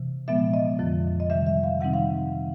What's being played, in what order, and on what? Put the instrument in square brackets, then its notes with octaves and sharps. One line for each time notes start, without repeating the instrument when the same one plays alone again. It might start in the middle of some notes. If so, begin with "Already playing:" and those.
Already playing: [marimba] C3 E3
A#2 F3 G#3 B3 E5
D#5
F2 D3 F3
D#5
C3 D#3 G3 E5
E5
F5
C3 D#3 G3 C4 D#4 F#5
F5